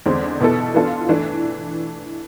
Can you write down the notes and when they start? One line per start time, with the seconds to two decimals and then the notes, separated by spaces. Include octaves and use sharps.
0.06 E2 D3 G#3 C4
0.40 B2 B3 E4 A4
0.74 E3 B3 D4 F4 A4
1.09 E3 A3 D4